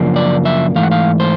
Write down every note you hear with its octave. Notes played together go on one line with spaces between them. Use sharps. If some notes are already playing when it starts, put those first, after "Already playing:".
Already playing: F#2 C#3 F3 A#3 D4
D5
E5
G#2 E3 A3 F5
F#5
F5
C5